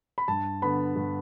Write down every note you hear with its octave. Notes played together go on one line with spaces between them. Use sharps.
B5
G2 A5
D3 B3 B5
G2